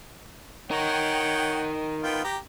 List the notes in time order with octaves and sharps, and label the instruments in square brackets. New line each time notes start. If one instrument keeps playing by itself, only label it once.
[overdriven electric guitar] D#4 A#4 [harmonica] C#5 F#5 G5
[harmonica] B3 F4 G5
G4 A#5